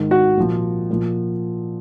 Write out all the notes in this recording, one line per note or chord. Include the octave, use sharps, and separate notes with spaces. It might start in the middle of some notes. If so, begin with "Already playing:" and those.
Already playing: G#2 D#3
F#4 F#5
A#2 F3
A#2 F3